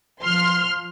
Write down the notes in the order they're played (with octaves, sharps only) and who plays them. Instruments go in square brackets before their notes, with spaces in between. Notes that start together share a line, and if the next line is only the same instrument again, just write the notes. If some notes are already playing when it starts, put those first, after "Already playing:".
[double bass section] F3 [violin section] C6 F6